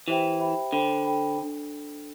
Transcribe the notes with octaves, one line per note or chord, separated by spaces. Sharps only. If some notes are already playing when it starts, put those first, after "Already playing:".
E3 G4 C5 E5 G5 B5
G4 C5 E5 G5 B5
D3 A4 C5 G5 B5
A4 C5 G5 B5
D4 A4